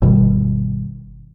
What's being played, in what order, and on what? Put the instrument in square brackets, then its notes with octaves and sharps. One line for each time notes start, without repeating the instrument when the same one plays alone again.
[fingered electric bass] G1 B2 D#3 G3